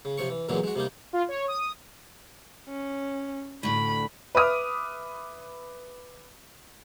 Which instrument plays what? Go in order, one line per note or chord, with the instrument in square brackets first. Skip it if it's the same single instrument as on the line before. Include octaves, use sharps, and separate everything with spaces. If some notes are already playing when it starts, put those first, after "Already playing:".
[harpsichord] C#3
C3 F3 C#5 C#6
E3
E2 A#2 D3 E3 F#3 G#3
G#3 F#4
C3 G3 A#3 D#4
[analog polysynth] F4
C#5
D#6
[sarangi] C#4
[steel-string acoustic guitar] D2 A2 [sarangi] B5
[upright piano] B4 E5 D6 D#6 F6